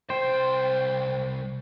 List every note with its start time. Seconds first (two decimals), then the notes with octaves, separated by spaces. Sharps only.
0.10 C2 C5 G5